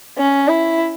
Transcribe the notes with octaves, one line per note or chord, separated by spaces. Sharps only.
C#4
E4